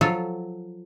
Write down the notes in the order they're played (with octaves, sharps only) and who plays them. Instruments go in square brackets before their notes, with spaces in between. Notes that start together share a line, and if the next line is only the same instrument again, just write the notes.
[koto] F3 F#3 F4 A4